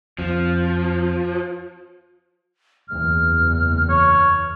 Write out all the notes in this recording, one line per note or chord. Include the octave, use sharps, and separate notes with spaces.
F2 F3
F#1 E2 E3 F6
C#5